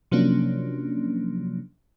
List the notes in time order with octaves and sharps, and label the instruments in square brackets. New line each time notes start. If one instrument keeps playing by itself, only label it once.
[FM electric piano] C3 F3 F#3 A#3 C#4 D4